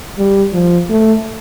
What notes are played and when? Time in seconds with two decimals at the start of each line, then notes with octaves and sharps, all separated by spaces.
0.18 G3
0.53 F3
0.89 A3